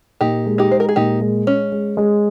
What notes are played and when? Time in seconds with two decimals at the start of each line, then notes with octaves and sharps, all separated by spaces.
0.21 A#2 D#4 G4
0.46 G#3
0.58 D#4 G4
0.71 G#3 C5
0.80 A#4
0.89 G#4
0.96 A#2 D#4 G4
1.21 G#3
1.46 G#3 C#4
1.72 G#3
1.97 G#3